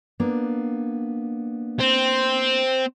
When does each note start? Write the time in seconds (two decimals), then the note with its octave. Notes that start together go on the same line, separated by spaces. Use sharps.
0.20 A#3 B3 D4
1.79 C4